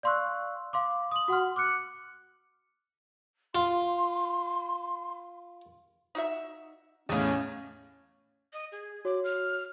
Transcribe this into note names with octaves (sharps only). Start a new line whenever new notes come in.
D5 F5 C6 C#6 E6 F#6
F5 C6 D6
D#6 F#7
F#4 F#5 C6 F6
D6 F6 F#6 C#7
F4 C6
D#4 F#4 E5
E2 A2 C#4 D#5 F5
D#5
G#4
F#4 C#5 D6
F6